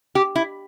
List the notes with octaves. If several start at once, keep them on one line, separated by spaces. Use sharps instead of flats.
G4
E4